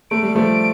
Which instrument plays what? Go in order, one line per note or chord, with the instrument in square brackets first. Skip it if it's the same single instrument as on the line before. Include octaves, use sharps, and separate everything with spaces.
[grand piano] A3 [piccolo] D7
[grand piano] G3
F3 A3